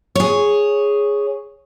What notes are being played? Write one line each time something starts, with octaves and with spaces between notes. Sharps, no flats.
G#4 C#5